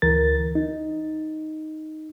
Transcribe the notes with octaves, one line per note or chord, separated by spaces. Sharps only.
D2 E3 A#4 A6
D#4